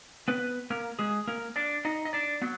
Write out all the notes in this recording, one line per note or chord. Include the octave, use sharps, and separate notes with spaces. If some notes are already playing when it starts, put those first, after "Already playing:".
B3 B4
A#3 A#4
G#3 G#4
A#3 A#4
D4 D5
D#4 D#5
D#5
D4 D5
F#3 B3